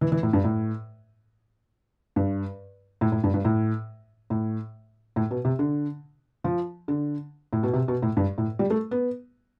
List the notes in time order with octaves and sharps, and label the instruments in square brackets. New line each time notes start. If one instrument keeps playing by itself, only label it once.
[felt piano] E3
E3
A2
G2
A2
G2
A2
A2
G2
G2
A2
A2
A2
B2
C3
D3
F3
D3
A2
B2
C3
B2
A2
G2
A2
G3
A3
B3